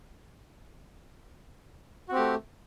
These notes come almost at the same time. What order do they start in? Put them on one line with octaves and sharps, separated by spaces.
F#4 C4 G4 A3